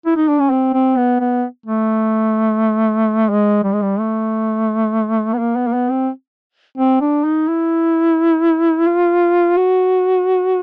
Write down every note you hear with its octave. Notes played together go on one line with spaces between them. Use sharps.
E4
D#4
D4
C#4
C4
C4
B3
B3
A3
G#3
G3
G#3
G3
A3
B3
A#3
B3
A#3
B3
C4
C4
D4
D#4
E4
F4
F#4